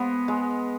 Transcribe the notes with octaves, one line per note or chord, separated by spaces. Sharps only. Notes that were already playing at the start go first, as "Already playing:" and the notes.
Already playing: G#3 B3
G#3